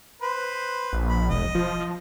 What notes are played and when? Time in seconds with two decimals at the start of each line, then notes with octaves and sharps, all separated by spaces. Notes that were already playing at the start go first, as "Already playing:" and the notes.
0.22 B4 C5
0.93 A#1
1.09 B5
1.30 E1 D#5
1.55 F3